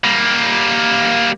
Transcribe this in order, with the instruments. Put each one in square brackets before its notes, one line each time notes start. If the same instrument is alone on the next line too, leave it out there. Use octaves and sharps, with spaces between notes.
[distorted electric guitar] G3 A#3